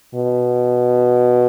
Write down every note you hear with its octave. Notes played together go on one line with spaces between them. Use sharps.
B2